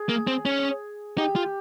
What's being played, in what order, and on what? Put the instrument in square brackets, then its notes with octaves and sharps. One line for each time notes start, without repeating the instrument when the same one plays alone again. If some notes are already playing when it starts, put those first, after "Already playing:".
Already playing: [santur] G#4
[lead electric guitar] A#3
C4
C#4
[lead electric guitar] D#4 [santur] G4
[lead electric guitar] F4